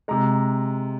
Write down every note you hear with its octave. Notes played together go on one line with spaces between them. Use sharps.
C3 G#3 A#5